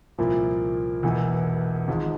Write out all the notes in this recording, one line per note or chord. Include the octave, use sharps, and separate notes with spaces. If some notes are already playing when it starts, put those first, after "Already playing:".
C2 A#2 F3 A#3 E4
E1 E2 E3 A#3
G#1 G#2 F3 G#3